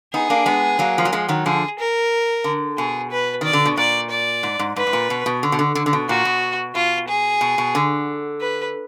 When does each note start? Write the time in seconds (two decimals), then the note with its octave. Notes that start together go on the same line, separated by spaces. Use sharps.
0.14 B3 D#4 G#4
0.30 A#3 D4
0.46 G#3 B3
0.79 F#3 A#3
0.98 F3
1.05 F#3
1.13 F3 G#3
1.28 D#3 F#3
1.46 D3 F3 G#4
1.79 A#4
2.44 D3
2.78 B2 G#4
3.11 B4
3.41 D#3 D5
3.53 D3
3.66 B2
3.77 A#2 D5
4.10 D5
4.43 G#2
4.59 G#2
4.76 G#2 B4
4.87 G#2
4.93 A#2
5.10 B2
5.26 B2
5.43 D3
5.52 B2
5.59 D3
5.75 D3
5.86 D3
5.93 B2
6.08 A#2 F#4
6.25 B2
6.75 B2 F4
7.08 G#4
7.41 B2
7.58 B2
7.75 D3
8.41 B4